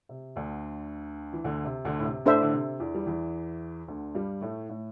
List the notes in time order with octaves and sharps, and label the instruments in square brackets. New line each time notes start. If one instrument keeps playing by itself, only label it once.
[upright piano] C3
D2 D3
E3
D2 D3
C3
D2 D3
A2
C3
[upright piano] A2 [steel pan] D4 A4 C5 E5
[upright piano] D3
C3
E2 E3
G3
E2 E3
D2 D3
G2 G3
A2 A3
A2